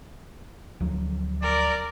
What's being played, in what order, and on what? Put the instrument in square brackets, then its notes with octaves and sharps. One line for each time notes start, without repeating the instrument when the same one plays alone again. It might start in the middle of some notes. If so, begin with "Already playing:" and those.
[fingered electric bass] D2 F3 F#3
[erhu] A#4 [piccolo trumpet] D5